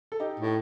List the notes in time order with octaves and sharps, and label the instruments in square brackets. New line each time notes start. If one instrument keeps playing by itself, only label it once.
[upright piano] A4
D#4 G4
[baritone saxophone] A2